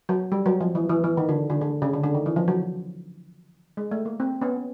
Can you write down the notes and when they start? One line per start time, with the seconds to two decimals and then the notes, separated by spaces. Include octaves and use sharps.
0.09 F#3
0.32 G3
0.46 F#3
0.61 F3
0.75 E3
0.89 E3
1.04 E3
1.17 D#3
1.29 D3
1.50 D3
1.61 D3
1.82 C#3
1.93 D3
2.04 D3
2.15 D#3
2.26 E3
2.36 F3
2.48 F#3
3.77 G#3
3.91 A3
4.06 A#3
4.20 C4
4.41 B3 C#4